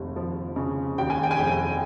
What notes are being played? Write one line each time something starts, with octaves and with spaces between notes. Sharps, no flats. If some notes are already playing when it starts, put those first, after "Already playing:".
Already playing: F1 D#2
F3
C#3
D#2 G5
G#5
G5
G#5
F1 G5